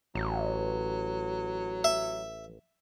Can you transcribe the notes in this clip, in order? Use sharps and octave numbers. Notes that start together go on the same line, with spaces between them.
A1 F#3
E5